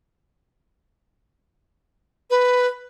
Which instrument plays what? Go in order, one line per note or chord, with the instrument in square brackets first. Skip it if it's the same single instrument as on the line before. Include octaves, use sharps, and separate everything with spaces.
[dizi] B4